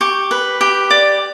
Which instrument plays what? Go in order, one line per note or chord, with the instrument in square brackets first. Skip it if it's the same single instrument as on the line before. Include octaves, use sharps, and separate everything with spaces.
[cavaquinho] G4 C#6
B4
G4
D5